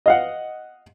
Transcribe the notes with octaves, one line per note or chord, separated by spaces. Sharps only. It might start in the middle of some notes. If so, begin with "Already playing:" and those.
D#5 F5 F#5